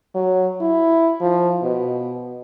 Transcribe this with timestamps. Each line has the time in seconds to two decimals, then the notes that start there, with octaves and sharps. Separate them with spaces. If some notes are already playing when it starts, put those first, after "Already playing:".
0.15 F#3
0.61 E4
1.21 F3
1.62 B2